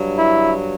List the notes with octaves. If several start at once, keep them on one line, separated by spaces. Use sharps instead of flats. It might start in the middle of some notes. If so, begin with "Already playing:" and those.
Already playing: G2 F#3
E4